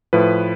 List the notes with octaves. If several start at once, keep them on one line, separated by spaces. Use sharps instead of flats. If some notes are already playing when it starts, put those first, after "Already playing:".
A2 F3 B4